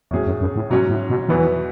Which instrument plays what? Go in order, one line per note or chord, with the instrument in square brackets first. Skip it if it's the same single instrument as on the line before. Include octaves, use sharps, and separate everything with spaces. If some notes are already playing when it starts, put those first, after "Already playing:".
[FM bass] E2 [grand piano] A2 F#3 C#4 G#4
[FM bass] F#2
F#2
A2
[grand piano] G#2 F#3 C#4 [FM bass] B2
[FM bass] A2
B2
[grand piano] E2 B2 F#3 B3 [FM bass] E3